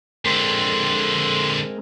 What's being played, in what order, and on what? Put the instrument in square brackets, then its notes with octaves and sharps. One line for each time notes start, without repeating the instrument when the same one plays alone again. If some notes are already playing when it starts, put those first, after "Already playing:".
[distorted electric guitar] F2 D3 [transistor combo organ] G#3 C4 A#4 [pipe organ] C6